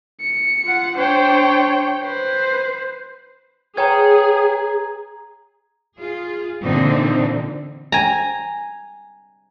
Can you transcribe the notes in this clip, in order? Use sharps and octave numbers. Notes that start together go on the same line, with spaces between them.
C#7
F4 F#5
D4 C5 C#5 G5
B4 C5
G#4 B4 C#5 G5 A#5 G#6
F4 G#4
A#2 D3 E3 C4 D#4
G#5 A#5